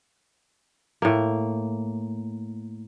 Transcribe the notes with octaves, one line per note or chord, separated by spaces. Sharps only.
A2 A#3